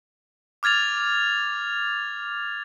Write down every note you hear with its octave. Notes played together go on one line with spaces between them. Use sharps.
D6 F6 G#6 A6 F7